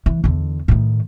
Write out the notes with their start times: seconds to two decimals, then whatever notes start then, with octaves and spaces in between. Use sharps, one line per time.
0.06 E3
0.24 E2 D3
0.68 A2 D#3